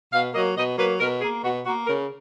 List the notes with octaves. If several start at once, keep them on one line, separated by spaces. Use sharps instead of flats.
B2 F5
F#3 A#3 D#5
B2 D#5
F#3 A#3 B4
B2 A#4
A#3 G#4
B2 F#4
A#3 F#4
C#3 A#4